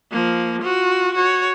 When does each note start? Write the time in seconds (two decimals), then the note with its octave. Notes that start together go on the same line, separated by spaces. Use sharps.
0.12 F3 A#3
0.62 F4 F#4
1.14 F#4 C#5